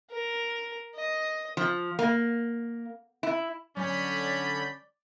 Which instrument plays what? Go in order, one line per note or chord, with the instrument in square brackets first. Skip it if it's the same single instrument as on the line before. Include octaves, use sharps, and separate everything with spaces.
[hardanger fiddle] A#4
D#5
[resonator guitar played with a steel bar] F3
A#3
E4
[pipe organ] D3 B5 G6 [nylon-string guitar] F#3 G#5 [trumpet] C#4 [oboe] D5